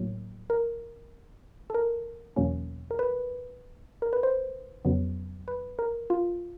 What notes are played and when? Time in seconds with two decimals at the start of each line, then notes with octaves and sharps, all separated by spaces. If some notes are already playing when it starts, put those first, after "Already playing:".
Already playing: A2 F#3 A#3
0.50 A#4
1.70 A4
1.74 A#4
2.36 E2 B2 F#3 A#3 C#4
2.91 A#4
2.99 B4
4.02 A#4
4.13 B4
4.23 C5
4.85 F2 C#3 F#3 B3
5.48 B4
5.79 A#4
6.10 F4